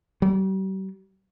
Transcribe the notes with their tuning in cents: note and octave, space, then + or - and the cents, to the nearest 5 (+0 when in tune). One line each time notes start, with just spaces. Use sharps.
G3 -40